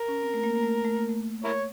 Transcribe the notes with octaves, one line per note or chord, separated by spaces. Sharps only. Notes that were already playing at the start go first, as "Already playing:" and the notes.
Already playing: A#4
C#4
C4
A3
A#3
A#3
A3
A3
A#3
A3
E4 A#4 C#5